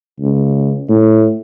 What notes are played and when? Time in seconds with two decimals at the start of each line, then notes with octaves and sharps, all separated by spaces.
0.19 C#2
0.89 A2